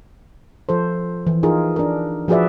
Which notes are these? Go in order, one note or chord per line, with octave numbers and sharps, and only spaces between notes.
F3 A4 C5
E3
D#4 F4 G#4 A#4
D4 A#4
F3 F#4 G#4 B4 D5 E5